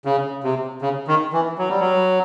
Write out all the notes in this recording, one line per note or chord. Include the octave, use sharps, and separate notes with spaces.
C#3
C3
C#3
D#3
E3
F#3
G3
F#3